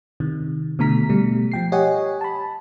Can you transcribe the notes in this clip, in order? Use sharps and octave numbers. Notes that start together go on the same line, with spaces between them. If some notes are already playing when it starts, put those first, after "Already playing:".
C3 D#3
B2 D3 A3 A#5 B6
B2 G3 A3
F3 G5 C7
G4 C#5 D#5 F#5 G#5
A5 B5